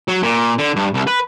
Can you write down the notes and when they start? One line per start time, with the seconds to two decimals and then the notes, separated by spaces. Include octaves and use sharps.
0.08 F#3
0.23 A#2
0.58 D3
0.76 G2
0.94 C2
1.07 B4